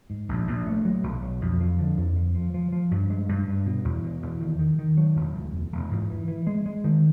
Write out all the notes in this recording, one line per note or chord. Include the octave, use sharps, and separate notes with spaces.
G#2
A#1
A#1
A3
F#3
B1
F#3
F2
F3
D3
F2
F3
F3
F3
F3
G2
G#3
G2
G2
B2
E2
B2
E2
D#3
D#3
D#3
F#3
E1
D2
E1
E1
G#2
E3
E3
G#3
G#3
D#3